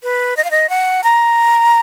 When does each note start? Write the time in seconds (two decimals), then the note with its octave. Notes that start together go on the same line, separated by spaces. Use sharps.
0.03 B4
0.37 D#5
0.44 F5
0.51 D#5
0.69 F#5
1.04 A#5